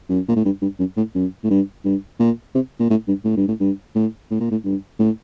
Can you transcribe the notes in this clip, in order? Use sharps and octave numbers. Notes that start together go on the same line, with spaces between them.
F#2
A#2
A2
G2
G2
F#2
A2
F#2
A2
G2
G2
A#2
C3
A#2
A2
G2
A2
G2
A2
G2
A2
A2
A#2
A2
G2
A2